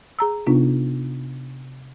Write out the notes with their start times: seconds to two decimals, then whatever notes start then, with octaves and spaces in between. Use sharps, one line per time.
0.19 G#4 A#5 E6
0.47 C3 B3 D4 D#4 F4